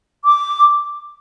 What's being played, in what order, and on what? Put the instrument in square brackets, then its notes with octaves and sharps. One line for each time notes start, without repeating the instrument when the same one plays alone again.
[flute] D6